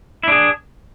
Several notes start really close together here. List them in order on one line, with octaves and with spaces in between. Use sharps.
E4 D4 G#4